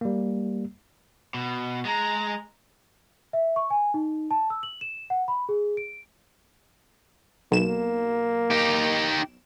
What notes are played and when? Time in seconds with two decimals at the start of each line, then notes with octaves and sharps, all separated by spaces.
0.01 G3 A#3
1.34 B2
1.85 G#3 A#5
3.33 E5
3.56 C#6
3.70 G#5
3.94 D#4
4.31 A5
4.50 E6
4.63 F#7
4.81 E7
5.10 F#5
5.28 B5
5.49 G#4
5.77 D7
7.52 B1 A#3 E7
8.51 D#4 G4